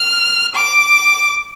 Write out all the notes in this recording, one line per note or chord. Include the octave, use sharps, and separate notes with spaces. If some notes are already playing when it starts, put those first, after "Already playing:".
Already playing: F6
D6